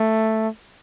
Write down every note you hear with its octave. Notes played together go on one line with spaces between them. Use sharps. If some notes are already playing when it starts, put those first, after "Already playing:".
Already playing: A3